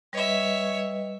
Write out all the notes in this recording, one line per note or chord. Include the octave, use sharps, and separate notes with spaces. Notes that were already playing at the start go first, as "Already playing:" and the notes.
G3 B4 C#5 D#5 E5